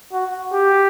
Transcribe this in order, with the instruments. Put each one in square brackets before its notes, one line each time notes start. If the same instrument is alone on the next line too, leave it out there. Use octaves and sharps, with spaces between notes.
[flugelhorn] F#4
G4